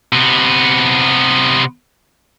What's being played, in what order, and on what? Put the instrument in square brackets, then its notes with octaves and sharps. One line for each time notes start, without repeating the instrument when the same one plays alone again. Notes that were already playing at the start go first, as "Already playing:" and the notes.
[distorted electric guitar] C3 B3